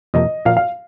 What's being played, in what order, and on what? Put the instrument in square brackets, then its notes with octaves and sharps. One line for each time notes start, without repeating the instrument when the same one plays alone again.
[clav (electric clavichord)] F2 C3 F3 A#3 [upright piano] D#5
[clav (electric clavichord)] A#2 F3 A#3 [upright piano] F5
[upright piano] F5